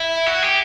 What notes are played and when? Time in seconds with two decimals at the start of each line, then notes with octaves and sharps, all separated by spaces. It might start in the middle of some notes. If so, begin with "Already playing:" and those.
Already playing: E4
0.26 F#4
0.43 G4